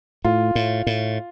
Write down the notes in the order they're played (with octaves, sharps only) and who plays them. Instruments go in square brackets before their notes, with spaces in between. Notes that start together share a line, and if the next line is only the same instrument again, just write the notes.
[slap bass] A2 [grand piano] F4
[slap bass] A2
A2